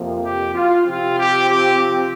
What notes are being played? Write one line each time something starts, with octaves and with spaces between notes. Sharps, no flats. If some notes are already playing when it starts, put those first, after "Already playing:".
Already playing: F2 C3 F3 A#3
G4
F4
C3 F3 C4 F4
G4
G4
G4